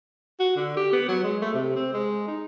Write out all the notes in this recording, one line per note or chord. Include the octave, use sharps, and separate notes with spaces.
F#4
D3
G4
B3
F#3
G#3
A3
C3
C4
G#3
D#4